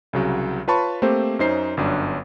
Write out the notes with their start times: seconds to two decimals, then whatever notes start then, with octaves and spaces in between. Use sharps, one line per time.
0.13 C2 C#3 F#3
0.68 F4 B4 C#5 A5 B5 C#6
1.02 A3 A#3 C4 G4 C5
1.39 F#2 C#4 D#4 C5 C7
1.77 G1 F#2 D4